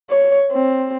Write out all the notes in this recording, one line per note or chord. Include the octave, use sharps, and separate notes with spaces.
C#5
C4